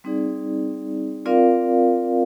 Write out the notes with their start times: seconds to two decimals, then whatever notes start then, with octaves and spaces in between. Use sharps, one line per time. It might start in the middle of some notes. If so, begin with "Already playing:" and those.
0.04 G3 C4 D#4 G#4 D5
1.26 C4 F4 A#4 D5 F5